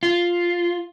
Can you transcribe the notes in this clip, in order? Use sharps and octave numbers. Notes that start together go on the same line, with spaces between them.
F4